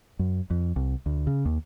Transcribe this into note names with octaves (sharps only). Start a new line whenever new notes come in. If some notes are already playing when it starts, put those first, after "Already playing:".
F#2
F2
C2
D2
C#3
D#2